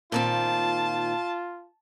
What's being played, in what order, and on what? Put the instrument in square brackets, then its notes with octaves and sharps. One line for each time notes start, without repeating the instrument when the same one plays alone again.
[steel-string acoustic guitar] A#2 D#3 C4 [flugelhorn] F4 [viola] A5